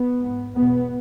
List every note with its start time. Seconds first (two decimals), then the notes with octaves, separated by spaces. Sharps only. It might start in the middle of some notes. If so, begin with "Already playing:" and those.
Already playing: B3
0.18 G#2
0.54 E2 B2 B3